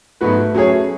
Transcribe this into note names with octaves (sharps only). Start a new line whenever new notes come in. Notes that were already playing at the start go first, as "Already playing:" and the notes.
G#2 F#3 A3 B3 F#4 B4
F#3 C#4 G#4 C#5